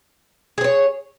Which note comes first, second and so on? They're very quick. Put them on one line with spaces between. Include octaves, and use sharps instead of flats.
G#4 C5 C#5